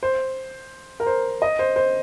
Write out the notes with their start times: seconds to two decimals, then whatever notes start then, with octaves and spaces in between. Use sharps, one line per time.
0.03 C5
1.00 A#4
1.06 C5
1.42 D#5
1.59 C5
1.76 C5